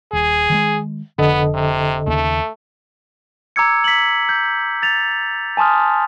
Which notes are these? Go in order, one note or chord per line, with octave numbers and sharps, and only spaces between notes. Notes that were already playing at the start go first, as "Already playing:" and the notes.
D#1 G#4
D#3 G3 G#3
F1 D3 B3 A4 D#5
C3
D#2 C#3 A3
A#5 D6 E6 G#6 C#7
B6 F#7
G6
A6 F7
G#5 A5 C6 D#6 F6